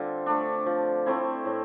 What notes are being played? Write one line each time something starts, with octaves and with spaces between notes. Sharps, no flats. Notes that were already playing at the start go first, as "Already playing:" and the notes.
Already playing: D3 G3 C4 F4
A3 D4
F3
A3 C4 E4
A2